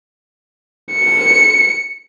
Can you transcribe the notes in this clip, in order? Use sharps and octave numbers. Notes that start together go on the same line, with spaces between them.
C#7